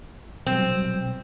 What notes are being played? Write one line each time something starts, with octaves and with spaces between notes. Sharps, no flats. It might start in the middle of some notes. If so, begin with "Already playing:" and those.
B2 F#3 G3 C4